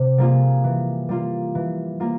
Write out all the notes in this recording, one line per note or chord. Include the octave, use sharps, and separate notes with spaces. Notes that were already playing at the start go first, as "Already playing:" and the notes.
Already playing: C3
G3 A#3 F4 G#4
E3
G3 A#3 F4
E3
G3 A#3 F4